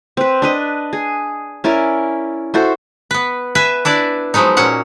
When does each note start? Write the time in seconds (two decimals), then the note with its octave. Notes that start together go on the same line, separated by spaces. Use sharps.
0.17 C4 B4
0.42 D4 B4 D#5
0.93 G#4
1.64 C#4 E4 A#4 D5
2.54 E4 F#4 A4 C5
3.11 B3 B4
3.55 B4 E5 G#5
3.85 D4 E4 B4 D5
4.34 F3 F#3 G#3 B3 D#4
4.57 A#2 F#3 C#4 F#5